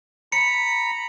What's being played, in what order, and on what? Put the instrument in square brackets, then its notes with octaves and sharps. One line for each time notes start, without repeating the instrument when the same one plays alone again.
[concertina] A#5 B5 [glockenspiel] C#7